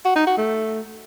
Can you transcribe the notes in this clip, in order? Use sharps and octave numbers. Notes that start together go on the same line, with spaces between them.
F#4
D#4
F#4
A3